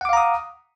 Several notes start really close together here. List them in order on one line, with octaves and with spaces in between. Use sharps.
F#5 D6 F5 A#5 D#6